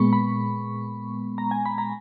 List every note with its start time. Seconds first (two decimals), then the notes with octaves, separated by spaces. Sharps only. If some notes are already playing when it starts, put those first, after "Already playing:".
Already playing: A#2 G#3 B3 B5 C#6
0.13 B5
1.38 A#5
1.51 G#5
1.66 B5
1.78 A#5